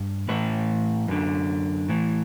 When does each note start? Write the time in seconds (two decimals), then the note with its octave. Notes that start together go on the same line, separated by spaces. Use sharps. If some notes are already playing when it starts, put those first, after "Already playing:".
Already playing: G2
0.28 A2 E3 B4
1.08 F#2 D3
1.88 A2 E3